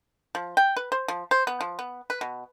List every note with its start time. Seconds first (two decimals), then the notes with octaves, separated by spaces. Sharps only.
0.35 F3
0.57 G5
0.77 B4
0.92 C5
1.08 F3
1.31 C5
1.47 B3
1.61 F3
1.79 B3
2.10 B4
2.21 B2